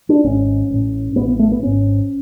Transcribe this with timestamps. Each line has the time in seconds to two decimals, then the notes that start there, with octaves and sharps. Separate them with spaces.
0.09 D4
0.24 G#1 G#2 C#4
0.70 A1 A2
1.16 A1 A2 B3
1.28 B3
1.39 A3
1.52 B3
1.63 G#1 G#2 C#4